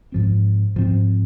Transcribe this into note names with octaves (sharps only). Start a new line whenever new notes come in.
G#2 F3 C4
G#2 F3 C4